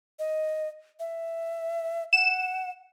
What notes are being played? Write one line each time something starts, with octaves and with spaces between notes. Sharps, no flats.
D#5
E5
F#5 E7